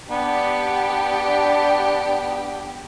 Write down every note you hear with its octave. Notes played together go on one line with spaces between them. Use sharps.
B3 D4 G4